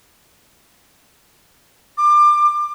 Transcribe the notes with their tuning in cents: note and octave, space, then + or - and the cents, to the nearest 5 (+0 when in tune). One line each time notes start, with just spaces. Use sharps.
D6 +25